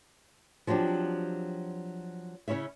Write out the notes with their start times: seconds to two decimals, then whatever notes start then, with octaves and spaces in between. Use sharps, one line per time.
0.67 F3 F#3 C4 D4 G4
2.48 C#3 C#4 E4 C#5 E5